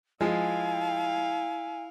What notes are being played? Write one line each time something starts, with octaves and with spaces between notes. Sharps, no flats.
F3 G#3 E4 F5 G#5